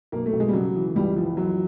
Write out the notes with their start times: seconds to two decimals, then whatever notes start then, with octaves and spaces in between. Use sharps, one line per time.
0.12 B1 A#3
0.26 A3
0.33 B1
0.40 G#3
0.49 G3
0.53 C#3 F#3
0.75 E3
0.96 C#2 G3
1.16 E3 F3
1.37 F#2 F#3